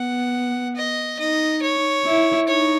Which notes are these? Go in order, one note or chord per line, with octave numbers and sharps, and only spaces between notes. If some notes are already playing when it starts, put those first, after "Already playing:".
Already playing: B3 F#5
D#5
D#4 D#5
C#5
E4
D#4 C#5